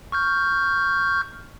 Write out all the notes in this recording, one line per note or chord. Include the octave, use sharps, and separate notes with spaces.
C#6 F6 G6